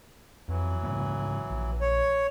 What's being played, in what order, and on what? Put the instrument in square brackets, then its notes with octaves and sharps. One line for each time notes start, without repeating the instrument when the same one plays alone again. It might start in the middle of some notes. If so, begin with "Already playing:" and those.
[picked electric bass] F2 [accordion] E3 F#3
[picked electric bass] G#2 C#3 A#3
A#1
[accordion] C#5